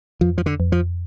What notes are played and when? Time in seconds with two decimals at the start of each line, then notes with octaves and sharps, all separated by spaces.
0.21 F2 F3
0.38 F3
0.46 D3
0.60 F2
0.72 F3